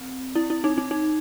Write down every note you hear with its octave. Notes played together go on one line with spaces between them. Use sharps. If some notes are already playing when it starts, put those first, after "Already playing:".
Already playing: C4
E4
E4
D#4
D#4
D#4